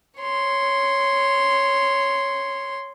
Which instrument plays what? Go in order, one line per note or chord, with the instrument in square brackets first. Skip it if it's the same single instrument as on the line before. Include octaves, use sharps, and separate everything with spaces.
[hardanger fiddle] C#5 C6